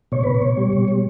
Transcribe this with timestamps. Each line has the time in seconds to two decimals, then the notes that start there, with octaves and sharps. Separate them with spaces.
0.12 B2 C#5
0.24 B2 B4
0.34 C#5
0.42 B2
0.57 G3
0.73 B2
0.88 G3